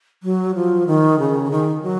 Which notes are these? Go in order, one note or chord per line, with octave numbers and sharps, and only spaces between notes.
F#3
F3
D#3
C#3
D#3
F#3